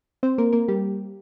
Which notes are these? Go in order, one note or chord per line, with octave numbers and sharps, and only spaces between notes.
C4 C5
A#3 A#4
A#3 A#4
G3 G4